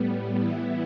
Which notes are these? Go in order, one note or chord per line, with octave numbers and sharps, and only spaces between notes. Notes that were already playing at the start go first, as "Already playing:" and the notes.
Already playing: A2 G3 B3
E3 B3 E4